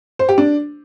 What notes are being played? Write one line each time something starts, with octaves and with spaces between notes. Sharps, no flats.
C5
G4
D4